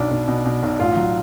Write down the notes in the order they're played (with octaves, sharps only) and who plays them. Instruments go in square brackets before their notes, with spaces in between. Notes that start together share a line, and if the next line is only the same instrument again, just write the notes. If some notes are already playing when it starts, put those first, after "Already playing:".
Already playing: [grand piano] B1 B2 D4
B1
B2
B2
B1
A1 F4
F#3